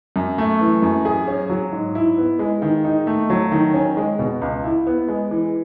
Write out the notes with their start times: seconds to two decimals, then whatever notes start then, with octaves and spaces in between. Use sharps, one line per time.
0.16 F#2
0.38 A3
0.61 E3
0.82 F#2
1.05 G#4
1.28 C#4
1.50 F#3
1.72 G#2
1.95 E4
2.18 B3
2.39 G#3
2.62 D#3
2.85 D#4
3.07 A3
3.30 F#3
3.52 D#3
3.74 C#4
3.97 G#3
4.19 B2
4.42 C#2
4.64 E4
4.87 B3
5.08 G#3
5.31 E3